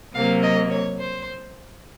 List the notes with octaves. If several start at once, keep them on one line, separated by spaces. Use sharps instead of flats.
C3 F#3 A#3 F5
D#5
C#5
C5